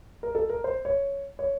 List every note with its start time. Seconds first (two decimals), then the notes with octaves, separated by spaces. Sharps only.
0.23 A#4
0.35 A4
0.50 A#4
0.64 C5
0.85 C#5
1.39 C#5